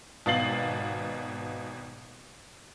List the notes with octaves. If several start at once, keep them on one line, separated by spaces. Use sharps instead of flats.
G#1 B2 F5 A6 C7 F#7